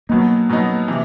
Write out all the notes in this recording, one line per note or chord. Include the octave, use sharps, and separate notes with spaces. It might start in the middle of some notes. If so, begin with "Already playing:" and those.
B2 F#3 A#3 B3 D#4
B2 F#3 B3 D#4
C3 E3